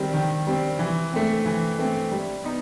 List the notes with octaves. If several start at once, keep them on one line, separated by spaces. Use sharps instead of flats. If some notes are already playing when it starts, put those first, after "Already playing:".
Already playing: D#3 G3 C4
D#3
G3 C4
E3
A3 C4
E3
A3 C4
G3
B3 D#4